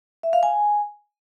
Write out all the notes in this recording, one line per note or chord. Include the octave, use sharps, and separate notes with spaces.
E5
F5
G#5